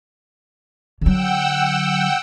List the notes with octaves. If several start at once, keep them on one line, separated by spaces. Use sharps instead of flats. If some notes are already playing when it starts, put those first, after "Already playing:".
D3 F#3 F#5 G5 E6